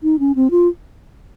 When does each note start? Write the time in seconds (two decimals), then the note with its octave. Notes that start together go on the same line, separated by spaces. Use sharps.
0.03 D#4
0.19 C#4
0.35 C4
0.51 F4